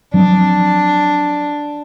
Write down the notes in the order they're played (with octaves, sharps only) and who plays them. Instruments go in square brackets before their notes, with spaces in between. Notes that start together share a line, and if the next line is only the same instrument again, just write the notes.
[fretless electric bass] F3 F#3 C4 [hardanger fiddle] D4